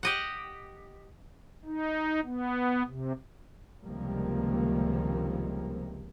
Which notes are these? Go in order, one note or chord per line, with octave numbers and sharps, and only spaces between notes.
G4 D#5 F#5
D#4
B3
C3
C#2 C3 D#3 F3 G3 A#3